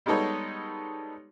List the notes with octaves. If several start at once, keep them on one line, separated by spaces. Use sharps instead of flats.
G3 G#3 B3 D#4 A4 C#5